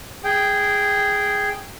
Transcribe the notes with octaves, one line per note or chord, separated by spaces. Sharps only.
G#4 G5